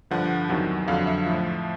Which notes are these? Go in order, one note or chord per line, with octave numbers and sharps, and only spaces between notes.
G2 D3 F3 F#5
E2 C3 D#3 F#3
F2 D3 F#3 F5
E5
A2 F3